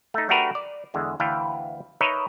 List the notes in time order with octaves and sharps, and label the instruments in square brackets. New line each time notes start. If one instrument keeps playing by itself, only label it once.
[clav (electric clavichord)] A3 D#4
A3 D4 F#4 G4 A#4 B4
D5
E2 D3 G#3
D2 E3 B4 F5 G5 A5
D#4 A#4 B4 C#5 D#5 E5